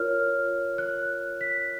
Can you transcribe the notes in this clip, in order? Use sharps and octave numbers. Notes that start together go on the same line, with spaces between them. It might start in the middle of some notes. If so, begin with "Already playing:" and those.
Already playing: F4 A#4 C#5 F6
F#6
B6